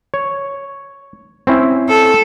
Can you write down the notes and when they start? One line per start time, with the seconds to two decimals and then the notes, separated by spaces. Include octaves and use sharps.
0.14 C#5
1.47 C4 C#4 E4
1.88 A4